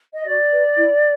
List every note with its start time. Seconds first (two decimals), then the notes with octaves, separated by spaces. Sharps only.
0.14 D#5
0.25 F#4 D5
0.51 B4
0.77 E4